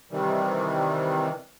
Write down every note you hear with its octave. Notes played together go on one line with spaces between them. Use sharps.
C3 D#3 E3 G3